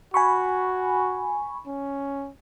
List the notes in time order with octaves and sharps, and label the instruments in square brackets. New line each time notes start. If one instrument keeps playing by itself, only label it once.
[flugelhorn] F#4 [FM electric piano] G#5 B5 C#6
[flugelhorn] C#4